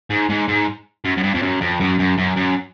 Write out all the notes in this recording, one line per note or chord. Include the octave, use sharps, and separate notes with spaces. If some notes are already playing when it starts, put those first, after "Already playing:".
G#2
G#2
G#2
F#2
F#2
G2
F2
F#2
F2
F#2
F#2
F#2
F#2